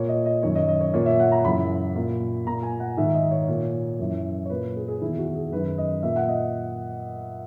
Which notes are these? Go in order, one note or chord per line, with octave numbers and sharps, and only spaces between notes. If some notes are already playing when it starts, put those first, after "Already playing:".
Already playing: A#2 C#5
D#5
D#5
F#2 D#3 C#5
D#5
D#5
C#5
A#2 C#5
E5
F#5
A#5
F#2 C#3 E3 B5
A#2
A#2 A#5
G#5
F#5
G#2 D#3 E5
D#5
C#5
A#2
F#2 E3
C#5
A#2 B4
G#4
G#4
E2 D#3 E4
F#4
G#4
F#2 D#3 B4
D#5
A#2 E5
F#5
D#5